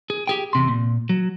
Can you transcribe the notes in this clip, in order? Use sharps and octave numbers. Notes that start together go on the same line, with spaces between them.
G#4
G4 G#4 G5
E2 C3 C6
A#2
F#3